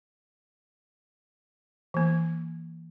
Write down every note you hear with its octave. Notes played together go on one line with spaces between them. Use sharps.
E3 A#3